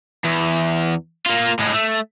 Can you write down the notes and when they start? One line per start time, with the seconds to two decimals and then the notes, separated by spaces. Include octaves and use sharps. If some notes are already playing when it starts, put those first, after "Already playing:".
0.25 E2
1.26 A#3 F4
1.59 A2 G#3
1.74 A3